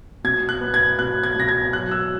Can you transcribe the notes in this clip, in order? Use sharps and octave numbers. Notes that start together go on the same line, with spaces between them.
B2 G#6
F#6
B3
G#6
B2 F#6
G#6
B2 A#6
G#6
F#3 F#6
E6